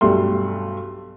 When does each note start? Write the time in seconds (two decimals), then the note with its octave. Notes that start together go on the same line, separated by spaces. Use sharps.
0.01 B1 G2 G3 A3 C6